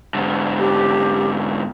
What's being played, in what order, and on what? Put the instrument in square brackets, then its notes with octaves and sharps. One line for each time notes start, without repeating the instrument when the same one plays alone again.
[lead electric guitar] G#2 D3
[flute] G4